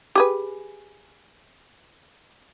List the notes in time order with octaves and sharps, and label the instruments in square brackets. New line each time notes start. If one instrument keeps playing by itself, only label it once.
[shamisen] G4 G#4 B4